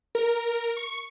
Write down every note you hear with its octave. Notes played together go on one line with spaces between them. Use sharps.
A#4
C#6